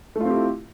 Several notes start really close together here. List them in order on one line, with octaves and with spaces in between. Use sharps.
A3 F4 C4 G4 E4